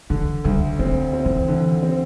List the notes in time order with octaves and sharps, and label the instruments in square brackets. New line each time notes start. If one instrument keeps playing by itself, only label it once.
[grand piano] D3 [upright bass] E3
[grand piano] D2 [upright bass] G3
[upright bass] A3 [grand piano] C4
[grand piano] C4
[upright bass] E3
[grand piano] D3
C4